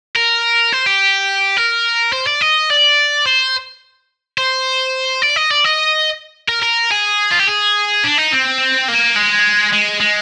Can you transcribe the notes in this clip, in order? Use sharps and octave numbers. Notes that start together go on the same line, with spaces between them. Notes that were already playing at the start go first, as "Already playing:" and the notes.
A#4
C5
G4
A#4
C5
D5
D#5
D5
C5
C5
D5
D#5
D5
D#5
A#4
A#4
G#4
F4
G4
G#4
D4
D#4
C4
A#3
G#3
G#3
G#3